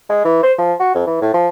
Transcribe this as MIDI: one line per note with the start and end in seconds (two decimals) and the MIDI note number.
0.10 0.21 56
0.25 0.40 52
0.43 0.53 72
0.58 0.74 53
0.80 0.94 66
0.95 1.06 41
1.07 1.17 52
1.22 1.34 45
1.34 1.49 53